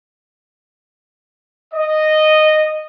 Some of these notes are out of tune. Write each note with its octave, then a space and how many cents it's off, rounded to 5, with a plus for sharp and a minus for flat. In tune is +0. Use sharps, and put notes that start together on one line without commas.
D#5 -10